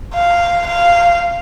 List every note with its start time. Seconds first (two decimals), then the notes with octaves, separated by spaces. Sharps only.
0.14 F5
0.67 F5